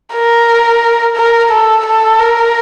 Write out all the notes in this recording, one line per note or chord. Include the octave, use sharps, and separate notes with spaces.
A#4
A#4
A4
A4
A#4